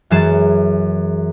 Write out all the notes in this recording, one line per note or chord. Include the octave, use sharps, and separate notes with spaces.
F#2 E3 G#3 A6 C#7 E7